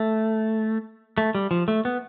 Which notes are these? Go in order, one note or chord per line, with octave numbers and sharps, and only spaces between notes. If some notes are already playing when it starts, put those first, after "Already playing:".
Already playing: A3
A3
G3
F3
A3
B3